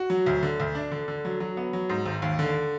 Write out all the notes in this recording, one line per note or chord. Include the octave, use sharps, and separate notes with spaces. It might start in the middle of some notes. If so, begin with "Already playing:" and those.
Already playing: F#4
F#3
D2
D3
D2
D4
D3
D3
F#3
F#3
B3
F#3
G#2
G#1
D#2
D3